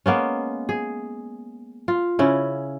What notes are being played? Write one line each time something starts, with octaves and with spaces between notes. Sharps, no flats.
G#3 A#3 B3 C#4
G#4
F4
C#3 C#4 E4